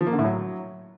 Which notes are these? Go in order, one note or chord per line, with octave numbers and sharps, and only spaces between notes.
F3
A#3
D3
A2
F#3